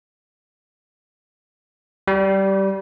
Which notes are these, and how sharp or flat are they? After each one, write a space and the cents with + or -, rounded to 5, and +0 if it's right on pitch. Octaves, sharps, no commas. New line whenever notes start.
G3 -15